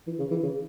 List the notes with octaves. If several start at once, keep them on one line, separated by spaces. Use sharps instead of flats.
E3
C#3
E3
C#3